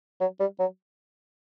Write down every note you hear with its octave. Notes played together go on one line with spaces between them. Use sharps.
F#3
G3
F#3